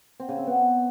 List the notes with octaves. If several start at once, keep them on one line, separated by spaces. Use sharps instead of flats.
C4
C#3
C4
B3